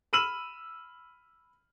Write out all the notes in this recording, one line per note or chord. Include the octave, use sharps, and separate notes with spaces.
B5 E6 F6 D#7 E7 F#7